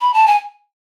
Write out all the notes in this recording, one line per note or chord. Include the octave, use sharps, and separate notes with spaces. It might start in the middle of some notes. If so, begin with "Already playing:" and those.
B5
A5
G#5